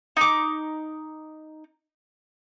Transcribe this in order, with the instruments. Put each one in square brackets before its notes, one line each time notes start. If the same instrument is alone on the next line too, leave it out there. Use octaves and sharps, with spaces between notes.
[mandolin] D#4 D6